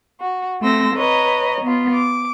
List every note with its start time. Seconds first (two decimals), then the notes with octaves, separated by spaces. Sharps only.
0.21 F#4
0.61 A3 C4 C6 E6 A#6
0.96 B4 C#5 D#5 A#5
1.62 B3 F4
1.93 D6